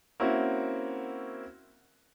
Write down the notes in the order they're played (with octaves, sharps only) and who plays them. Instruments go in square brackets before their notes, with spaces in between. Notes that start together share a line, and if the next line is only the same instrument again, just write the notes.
[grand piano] A#3 C4 C#4 E4 F#4